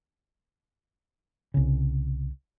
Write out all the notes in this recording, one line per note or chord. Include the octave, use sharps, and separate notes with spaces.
C2 C#3